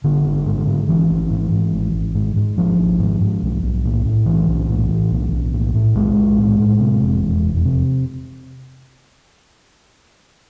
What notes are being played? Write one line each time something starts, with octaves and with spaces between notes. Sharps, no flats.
G#1 D3
G#1
G#2
G#2
G#1 E3
G#1
G#2
G#2
G#1
G#1
G#2
G#2
G#1 F3
G#1
G#2
G#2
B1
B1
A2
A2
B1 E3
B1
A2
A2
B1
B1
A2
A2
B1 G#3
B1
A2
A2
C3
F1
E2
F1
C3